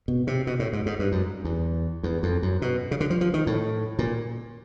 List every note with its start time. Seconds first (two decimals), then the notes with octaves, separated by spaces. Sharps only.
0.08 B2
0.27 C3
0.47 B2
0.59 A2
0.73 G#2
0.86 G#2
0.99 G2
1.12 F#2
1.44 E2
2.03 E2
2.23 F2
2.42 F#2
2.62 B2
2.91 C#3
3.00 D3
3.10 F3
3.21 F3
3.34 D#3
3.47 A2
3.99 A#2